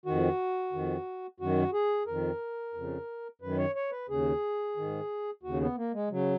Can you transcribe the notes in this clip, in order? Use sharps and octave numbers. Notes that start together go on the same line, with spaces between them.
F2 D#3 F#4
F2 D#3
F#2 D#3 F#4
G#4
F2 D#3 A#4
F2 C#3
F#2 D#3 B4
C#5
C#5
B4
D#2 C#3 G#4
G#2 D#3
D#2 C#3 F#4
B3
A#3
G#3
C#3 F#3